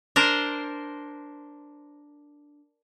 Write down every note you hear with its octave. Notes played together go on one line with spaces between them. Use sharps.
D4 A#4 C5